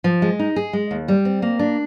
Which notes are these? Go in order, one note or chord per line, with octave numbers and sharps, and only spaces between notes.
F3
G#3
D#4
G#4
G#3
D#2
G3
C4
A#3
D4